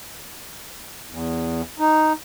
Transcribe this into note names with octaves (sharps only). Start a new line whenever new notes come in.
E2
D#4